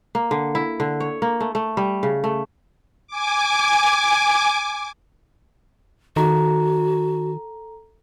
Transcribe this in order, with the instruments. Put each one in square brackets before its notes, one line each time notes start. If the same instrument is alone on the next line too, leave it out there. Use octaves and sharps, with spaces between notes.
[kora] A#3
D3
E4
D3
C#5
A#3
A3
A3
G3
C#3
A3
[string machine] G#5 D6
[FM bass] D#3 [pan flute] F#4 [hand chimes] A4 A#5